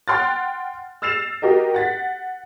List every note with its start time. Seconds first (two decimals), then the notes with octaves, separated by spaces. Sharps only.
0.08 F#5 G5 C6 F6 F#6 A6
1.02 E6 F6 A6 C7 E7 F7
1.42 F#4 G4 A#4 D#5
1.74 F#5 A6 B6